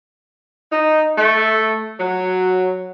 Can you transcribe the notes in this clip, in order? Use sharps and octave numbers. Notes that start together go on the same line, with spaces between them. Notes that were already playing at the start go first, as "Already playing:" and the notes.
D#4
A3
F#3